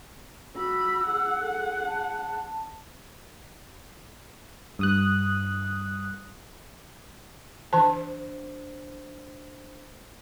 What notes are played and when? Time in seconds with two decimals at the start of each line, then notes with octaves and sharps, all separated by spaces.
0.56 F#4 B5 E6
1.05 G#4 F#5
1.41 A4
1.86 A5
4.79 G2 D#6 F#6
7.73 E3 D4 C5 A5